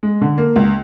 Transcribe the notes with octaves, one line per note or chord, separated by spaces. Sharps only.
G#3
D3
A#3
C#2